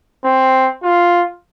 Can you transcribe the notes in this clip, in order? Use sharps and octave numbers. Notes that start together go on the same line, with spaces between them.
C4
F4